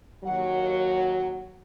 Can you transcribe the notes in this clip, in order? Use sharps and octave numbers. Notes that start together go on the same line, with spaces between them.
D#2 F#3 F#5